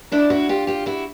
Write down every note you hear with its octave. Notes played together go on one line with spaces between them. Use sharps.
D4 E4
E4 F#4
F4 G4
F4 G4
E4 F#4